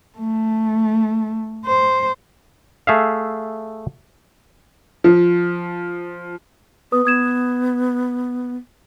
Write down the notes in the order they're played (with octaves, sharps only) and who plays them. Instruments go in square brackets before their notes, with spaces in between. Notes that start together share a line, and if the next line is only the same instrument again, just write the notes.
[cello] A3
C5
[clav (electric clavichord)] A3 G#4 E5 F5
[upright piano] F3
[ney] B3 [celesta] B4 D#6
[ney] B3 [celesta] D#6 G#6 E7